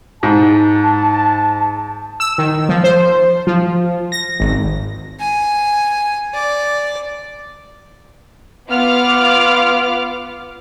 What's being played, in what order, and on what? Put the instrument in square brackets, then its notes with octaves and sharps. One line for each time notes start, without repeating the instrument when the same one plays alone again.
[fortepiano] G#2 [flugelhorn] A5
[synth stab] E6
D#3
F3
C5
F3
A#6
G#1
[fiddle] G#5
D5
[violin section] B3 F4 D6 F6